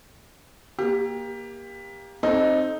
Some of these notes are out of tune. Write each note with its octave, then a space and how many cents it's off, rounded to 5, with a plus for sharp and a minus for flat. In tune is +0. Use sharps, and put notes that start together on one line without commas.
A#3 +15 G4 +20
C4 +20 D#4 +0 A4 -15